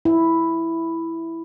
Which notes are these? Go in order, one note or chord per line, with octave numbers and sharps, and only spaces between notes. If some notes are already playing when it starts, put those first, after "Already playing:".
E4